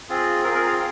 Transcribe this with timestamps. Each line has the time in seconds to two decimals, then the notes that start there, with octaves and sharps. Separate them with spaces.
0.09 C4 F4 G#4
0.44 C4 F4 G#4 A#4
0.55 A#4
0.67 F5